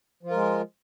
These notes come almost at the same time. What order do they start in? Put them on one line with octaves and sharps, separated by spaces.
F3 F4 A#4 G#3